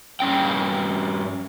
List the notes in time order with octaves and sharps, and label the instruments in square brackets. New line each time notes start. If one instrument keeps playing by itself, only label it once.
[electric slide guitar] G2 C#4 G5